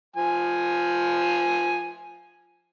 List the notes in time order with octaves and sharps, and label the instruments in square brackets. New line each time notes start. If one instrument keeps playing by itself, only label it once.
[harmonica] F3 G#5